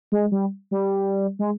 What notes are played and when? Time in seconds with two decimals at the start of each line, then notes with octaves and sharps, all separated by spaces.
0.12 G#3
0.32 G3
0.71 G3
1.39 G#3